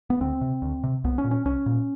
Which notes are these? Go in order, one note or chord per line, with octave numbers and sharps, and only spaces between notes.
B3
D2 C4
C3
D2
C3
C2 B3
C#4
A#2
C#4
C2 C#4
A#2